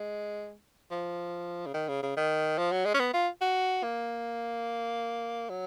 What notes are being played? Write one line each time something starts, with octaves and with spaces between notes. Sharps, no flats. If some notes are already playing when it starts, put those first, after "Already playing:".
Already playing: G#3
F3
C#3
D#3
C#3
C#3
D#3
F3
F#3
G#3
C#4
B3
F4
F#4
A#3
F#3